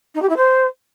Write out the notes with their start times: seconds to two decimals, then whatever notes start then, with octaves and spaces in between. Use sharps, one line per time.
0.15 D#4
0.22 G4
0.29 E4
0.37 C5